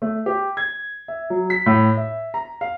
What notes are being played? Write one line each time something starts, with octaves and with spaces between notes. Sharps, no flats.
A3
G4
G#6
E5
F#3
B6
A2
E5
A#5
F5